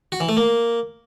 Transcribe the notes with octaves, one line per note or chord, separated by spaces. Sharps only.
F#4
E3
A3
A#3